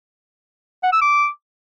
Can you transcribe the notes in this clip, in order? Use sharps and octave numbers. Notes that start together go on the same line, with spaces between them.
F#5
E6
D6